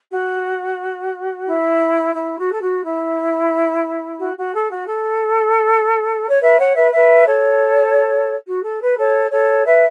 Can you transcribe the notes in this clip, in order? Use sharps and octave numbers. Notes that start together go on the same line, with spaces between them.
F#4
E4
E4
F#4
A4
F#4
E4
F#4
F#4
A4
F#4
A4
C#5
B4 E5
C#5 F#5
B4 E5
B4 E5
A4 C#5
F#4
A4
B4
A4 C#5
A4 C#5
B4 E5